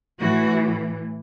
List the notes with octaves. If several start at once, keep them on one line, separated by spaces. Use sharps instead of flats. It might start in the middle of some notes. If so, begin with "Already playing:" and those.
A2 E3 F#4